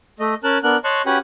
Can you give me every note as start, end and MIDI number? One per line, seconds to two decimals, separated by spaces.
0.20 0.34 57
0.20 0.34 75
0.44 0.58 61
0.44 0.58 70
0.44 0.58 81
0.44 0.58 90
0.63 0.77 59
0.63 0.77 62
0.63 0.77 70
0.63 0.77 90
0.84 1.02 73
0.84 1.02 75
0.84 1.02 81
0.84 1.02 84
0.84 1.02 85
0.84 1.02 90
1.06 1.18 61
1.06 1.18 66
1.06 1.18 67
1.06 1.18 71
1.06 1.18 78
1.06 1.18 80